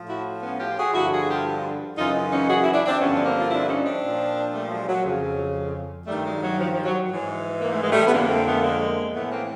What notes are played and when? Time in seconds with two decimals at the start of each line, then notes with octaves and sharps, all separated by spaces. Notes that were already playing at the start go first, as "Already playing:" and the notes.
Already playing: A2 F3
0.09 E4 F#4
0.43 B3 C#4
0.60 F4 G4
0.77 F#4 G#4
0.94 G2 D3 F3 E4 F#4
1.11 F#4 G#4
1.28 F4 G4
1.97 F#2 C#3 E3 D#4 F4
2.31 C#4 D#4
2.48 F#4 G#4
2.60 E4 F#4
2.73 D4 E4
2.86 C4 D4
2.99 G2 D3 F3 B3 C#4
3.16 B3
3.25 A#3 C4
3.39 F4
3.50 D4 E4
3.68 C#4 D#4
3.85 C4 D4
4.02 A#2 F3
4.53 G3 A3
4.70 F#3 G#3
4.87 F#3
5.04 F2 C#3 F3
6.07 G2 D#3 G3 A3
6.25 F#3 G#3
6.42 F#3
6.58 F3
6.72 F3
6.85 F#3
7.10 G#2 E3
7.61 A#3
7.72 A3
7.82 G#3
7.92 G3 A3
8.06 B3
8.13 F2 D3 F3 G#3 A#3
8.29 A#3 C4
8.46 A3 B3
8.63 G#3 A#3
9.14 A2 E3 A3 B3
9.32 A#3 C4